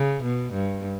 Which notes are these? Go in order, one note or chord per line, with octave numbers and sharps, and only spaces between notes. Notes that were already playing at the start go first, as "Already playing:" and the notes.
Already playing: C#3
B2
G2